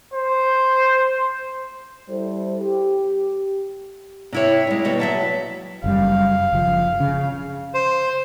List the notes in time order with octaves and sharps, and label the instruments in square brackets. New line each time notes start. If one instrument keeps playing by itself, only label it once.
[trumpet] C5
[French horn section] G3 E4 A4 C5
G4
[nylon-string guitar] C3 E4 C#5
G3 G#3
D#2 B2 G3 C#5
F#3 E5 A5
[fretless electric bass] F#1 F#2 G3 [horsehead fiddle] F5
[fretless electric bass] F#1 F3
C#3
[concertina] C5